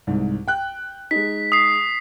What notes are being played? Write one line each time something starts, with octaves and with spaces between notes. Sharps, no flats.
C2 G#2
G5 F#6
G#3 D#4 B6
D#6 C7